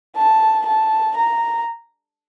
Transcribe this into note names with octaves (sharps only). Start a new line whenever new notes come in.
A5
A5
A#5